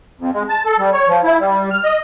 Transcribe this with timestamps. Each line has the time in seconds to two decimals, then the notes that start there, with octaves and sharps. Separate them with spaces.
0.20 F2
0.34 G#3
0.49 A5
0.66 A4
0.79 G3
0.93 C#5
1.08 F3
1.24 E4
1.41 G3
1.71 F6
1.84 D#5